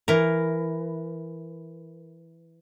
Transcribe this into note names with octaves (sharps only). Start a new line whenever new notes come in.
E3 A#4